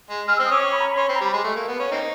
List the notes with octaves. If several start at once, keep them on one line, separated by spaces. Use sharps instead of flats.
G#3
G#3 F6
E6
C4
D#6
C#4 D6
C#6
B5
A#5
B5
C#4 C6
C4 B5
A#5
G3
B5
G#3
A3
A#3
B3
C#4
A#3 C4 D#4